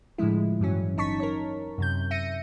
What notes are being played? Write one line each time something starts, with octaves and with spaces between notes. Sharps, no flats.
A2 D3 F3 G#3 E4
G2 E3 F#3 C#4
G1 D#4 A5 C#6 B6
A#4 C#5
F#2 C3 G6
E5 A#6 C#7 D#7